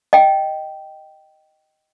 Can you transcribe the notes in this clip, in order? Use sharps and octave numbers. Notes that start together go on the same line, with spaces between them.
D#5 G5